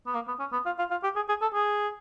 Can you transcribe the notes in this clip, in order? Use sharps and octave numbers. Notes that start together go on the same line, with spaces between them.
B3
A#3
B3
C#4
B3
F4
F4
F4
G4
G#4
G#4
A4
G#4